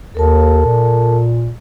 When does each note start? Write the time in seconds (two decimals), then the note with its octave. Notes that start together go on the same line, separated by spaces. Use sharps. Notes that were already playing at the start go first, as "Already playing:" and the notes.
0.15 D#2 A4 A#4 A5
0.65 A#2